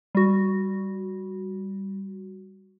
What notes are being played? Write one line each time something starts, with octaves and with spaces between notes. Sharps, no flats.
G3 F#4